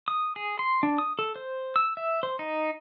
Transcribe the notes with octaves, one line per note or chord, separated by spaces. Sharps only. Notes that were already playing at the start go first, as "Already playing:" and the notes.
D#6
G#4
C6
D4
D#6
A4
C5
E6
E5
C5
D#4